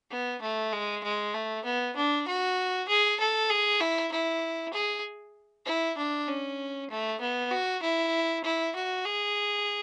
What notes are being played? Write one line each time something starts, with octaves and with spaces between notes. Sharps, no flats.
B3
A3
G#3
G#3
A3
B3
D4
F#4
G#4
A4
G#4
E4
E4
G#4
E4
D4
C#4
A3
B3
F#4
E4
E4
F#4
G#4